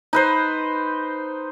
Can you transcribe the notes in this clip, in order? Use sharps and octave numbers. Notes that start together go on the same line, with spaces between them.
D#4 B4 C5